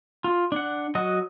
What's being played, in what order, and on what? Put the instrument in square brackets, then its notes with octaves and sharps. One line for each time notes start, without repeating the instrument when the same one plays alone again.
[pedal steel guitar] F4
D4 F#5
F#3 F#4 D#5